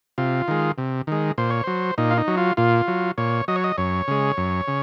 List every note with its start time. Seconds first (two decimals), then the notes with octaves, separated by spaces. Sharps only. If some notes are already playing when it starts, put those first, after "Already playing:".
0.18 C3 F4
0.48 D#3 G#3
0.78 C3
1.07 D#3 G#3
1.38 A#2 C5
1.50 C#5
1.64 F#3 C5
1.98 A#2 D#4
2.11 F4
2.18 D#4
2.28 F#3
2.37 F4
2.57 A#2 F4
2.88 F#3
3.18 A#2 C#5
3.48 F#3 D#5
3.56 C#5
3.64 D#5
3.78 F#2 C#5
4.08 C#3 G#3
4.37 F#2
4.68 C#3